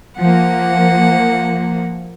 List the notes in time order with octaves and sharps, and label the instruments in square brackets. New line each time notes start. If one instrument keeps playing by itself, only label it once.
[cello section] F3 A#3 [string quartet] F#5